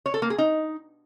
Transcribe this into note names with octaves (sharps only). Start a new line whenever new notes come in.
C#5
A4
A#3
G#4
D#4